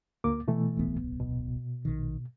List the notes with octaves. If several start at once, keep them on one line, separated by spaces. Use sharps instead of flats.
D2 A#3 D6
B2 E3 A3
D1 B1 B3
B2
A#1 D#3